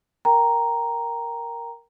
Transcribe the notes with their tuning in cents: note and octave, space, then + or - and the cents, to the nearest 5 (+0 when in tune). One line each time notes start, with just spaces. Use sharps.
A#4 +0 G5 +0 A#5 +0